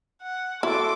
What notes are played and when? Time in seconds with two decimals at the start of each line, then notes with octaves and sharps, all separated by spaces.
0.23 F#5
0.63 E4 F#4 A4 E5 C6 D6